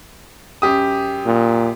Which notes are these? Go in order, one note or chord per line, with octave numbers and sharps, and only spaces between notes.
F#2 G4 D#6
A#2